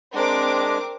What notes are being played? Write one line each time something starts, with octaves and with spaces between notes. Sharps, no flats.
G#3 C4 D4 A#4 D6